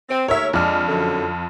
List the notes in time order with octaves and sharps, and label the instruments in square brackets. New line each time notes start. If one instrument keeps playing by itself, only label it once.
[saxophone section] C4
[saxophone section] D#2 A3 A#4 [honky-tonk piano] C#5 E5
[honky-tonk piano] F2 F6 [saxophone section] G#3 D4
[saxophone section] F#2 D3